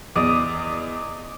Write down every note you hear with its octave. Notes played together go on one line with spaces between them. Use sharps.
E2 D5 D#5